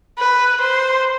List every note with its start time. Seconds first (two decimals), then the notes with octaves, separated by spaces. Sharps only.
0.18 B4
0.61 C5